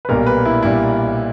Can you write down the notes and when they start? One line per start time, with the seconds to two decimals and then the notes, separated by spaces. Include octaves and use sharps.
0.05 B4
0.09 B1 A#2 G3 A#4
0.26 B4
0.45 E4
0.63 A#2 G3 E4